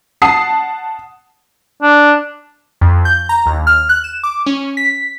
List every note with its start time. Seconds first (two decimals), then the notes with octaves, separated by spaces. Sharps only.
0.22 F#5 A5 D#6 C7
1.82 D4
2.81 F2
3.05 G6
3.29 A#5
3.46 D#2
3.67 F6
3.89 F#6
4.04 E7
4.23 D6
4.46 C#4
4.77 B6